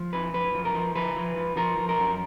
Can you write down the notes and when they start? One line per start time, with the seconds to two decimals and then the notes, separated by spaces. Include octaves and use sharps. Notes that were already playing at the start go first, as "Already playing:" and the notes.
Already playing: F3
0.13 F2 B4
0.34 F#2 B4
0.54 F3
0.65 A#4
0.74 F3
0.95 F3 B4
1.16 F3
1.36 F3
1.57 F3 A#4
1.78 F3
1.89 A#4
1.99 F#2